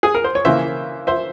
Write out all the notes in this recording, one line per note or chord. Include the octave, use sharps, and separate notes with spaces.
G#4
A#4
C5
C#5
C#3 E3 A#3 C5 E5
C5 E5